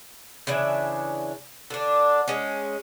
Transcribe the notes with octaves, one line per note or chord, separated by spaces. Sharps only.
C#3 E3 D4 E5
D3 D4
G#3 C#4